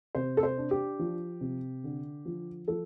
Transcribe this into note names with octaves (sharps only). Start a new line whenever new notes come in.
C3 C5
A4
C5
D4
G4
F3
C3
D3
F3
F3 A4